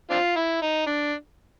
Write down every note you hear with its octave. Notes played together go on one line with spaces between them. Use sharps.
C4 D4 F4
E4
D#4
D4